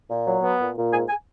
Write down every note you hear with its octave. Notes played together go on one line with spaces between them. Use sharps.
A#2
F#3
B3
A#2
A#2
G#2 G#5
G#5